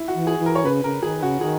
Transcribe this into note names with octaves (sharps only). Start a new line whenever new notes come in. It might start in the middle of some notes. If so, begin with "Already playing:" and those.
Already playing: E4
F#4
E3
G#4
E3
A#4
C#5
C#3 B4
C#3 A#4
D#3 G#4
C#3 F#4
D#3 G#4